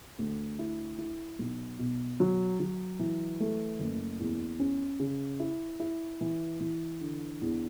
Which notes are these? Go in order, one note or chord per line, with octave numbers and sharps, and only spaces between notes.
D2
E4
E4
B1
B2
F#3
F#3
E3
A3
F#1
E2
C#4
C#3
E4
E4
E3
E3
D3
E2